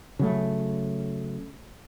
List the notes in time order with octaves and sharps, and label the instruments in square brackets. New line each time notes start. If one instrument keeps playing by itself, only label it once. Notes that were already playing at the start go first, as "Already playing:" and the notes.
[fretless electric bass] C#3 F#3 A3